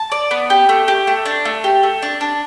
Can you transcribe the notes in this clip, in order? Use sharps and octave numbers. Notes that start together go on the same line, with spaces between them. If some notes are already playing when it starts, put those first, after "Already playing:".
Already playing: A5
D5
B3
G4
A3
G4
A3
D4
A3
G4
A3
D4
D4